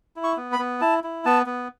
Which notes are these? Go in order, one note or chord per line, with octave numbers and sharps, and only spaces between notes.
E4
C#6
B3
B5
B3
E4 A5
E4
B3 A5
B3